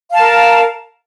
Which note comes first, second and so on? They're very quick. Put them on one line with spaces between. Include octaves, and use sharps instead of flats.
F5 A5 A#4